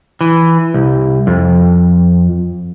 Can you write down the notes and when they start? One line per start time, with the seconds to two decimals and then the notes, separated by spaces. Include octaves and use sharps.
0.21 E3
0.74 C2
1.27 F2